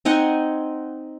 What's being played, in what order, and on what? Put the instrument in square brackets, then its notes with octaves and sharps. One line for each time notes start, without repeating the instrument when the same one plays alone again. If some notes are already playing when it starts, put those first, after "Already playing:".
[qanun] C4 D#4 F#5 G#5